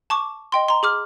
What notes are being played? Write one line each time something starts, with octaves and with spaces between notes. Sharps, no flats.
A5 C#6 D6
D#5 G5 C6
A#5 C6
G#4 D6 F6